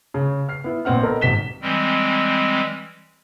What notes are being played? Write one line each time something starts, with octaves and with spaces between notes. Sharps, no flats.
C#3
F6 C7
B3 E4
A#1 B3 C4 F#5 F6
B3 A4 A#4 D#5
D#1 G#1 B6 E7 G7
E3 G3 G#3 C4